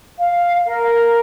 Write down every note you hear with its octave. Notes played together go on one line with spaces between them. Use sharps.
F5
A#4